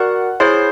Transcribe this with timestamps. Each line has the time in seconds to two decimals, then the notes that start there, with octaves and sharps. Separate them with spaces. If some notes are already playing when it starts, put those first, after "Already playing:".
Already playing: F#4 A#4 D5 F#5
0.40 E4 G#4 C5 C#5